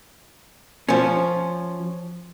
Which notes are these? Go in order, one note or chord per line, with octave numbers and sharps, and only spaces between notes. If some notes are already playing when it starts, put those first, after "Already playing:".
F3 C#4